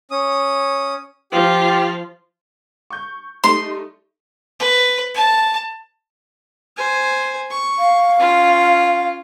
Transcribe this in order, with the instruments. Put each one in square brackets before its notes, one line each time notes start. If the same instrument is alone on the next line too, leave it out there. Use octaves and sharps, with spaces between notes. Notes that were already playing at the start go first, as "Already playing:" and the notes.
[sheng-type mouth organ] C#4 D#6
[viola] F3 F4 [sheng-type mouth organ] G4
[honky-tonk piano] C#6 G6
[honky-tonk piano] G3 A3 D#4 [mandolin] C6
[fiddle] B4
A5
[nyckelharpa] C5 G#5
C#6
[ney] F5
[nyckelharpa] C#4 F4